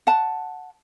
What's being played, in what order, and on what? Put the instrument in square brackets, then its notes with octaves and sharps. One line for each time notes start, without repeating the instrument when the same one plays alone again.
[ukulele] F#5 A5